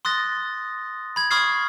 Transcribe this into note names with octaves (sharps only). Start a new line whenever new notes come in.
C6 D#6 F#6 A6 A#6
B5 G#6
B5 C#6 D#6 F6 G#6 C7